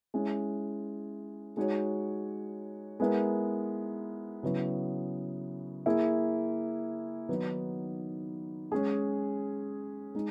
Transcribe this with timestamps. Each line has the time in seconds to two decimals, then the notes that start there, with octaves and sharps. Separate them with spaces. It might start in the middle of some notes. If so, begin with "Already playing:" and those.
0.14 G#3 C#4 E4
1.57 G#3 D#4 F#4 C#5
3.00 G#3 B3 E4 A#4
4.43 C#3 F#3 B3 E4
5.86 A#3 E4 G#4
7.29 D#3 F#3 B3 D#4
8.72 G#3 C#4 G#4
10.15 G#3 D#4